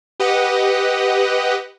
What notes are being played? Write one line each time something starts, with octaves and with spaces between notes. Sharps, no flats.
G4 B4 D#5 F#5